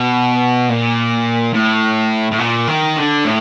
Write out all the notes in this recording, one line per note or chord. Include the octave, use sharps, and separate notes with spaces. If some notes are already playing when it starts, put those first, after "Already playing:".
Already playing: B2
A#2
A2
A2
A#2
D#3
D3
A2